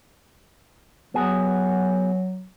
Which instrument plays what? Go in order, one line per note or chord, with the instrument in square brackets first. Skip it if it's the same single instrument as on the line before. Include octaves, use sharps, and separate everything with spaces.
[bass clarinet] F#3 [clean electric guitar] B3 F#4 G#4